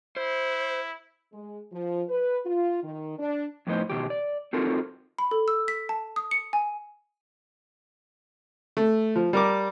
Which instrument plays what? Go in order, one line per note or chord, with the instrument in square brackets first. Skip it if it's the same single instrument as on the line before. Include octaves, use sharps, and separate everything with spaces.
[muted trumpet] E4 [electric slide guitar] C5
[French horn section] G#3
F3
B4
F4
D#3
D4
[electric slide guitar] F2 A2 B3 D#4 C5
B2 D#3 G4
D5
C4 D#4 F4 F#4 A4 A#4
[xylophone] B5
A4
E6
B6
A5
D#6
C#7
G#5
[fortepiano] A3
F3
G3 A#4 D6